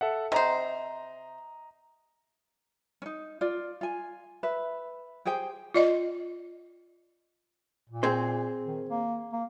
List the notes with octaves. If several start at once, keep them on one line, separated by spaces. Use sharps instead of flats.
A4 E5 F#5
C3 C5 D#5 A#5
C#4 D#4
F4 D5
F4 G#5
B4 E5
G4 G#4 C5 G5
F4 D5 D#5
A#2
C4 G#4 C5
D#3
A#3
A#3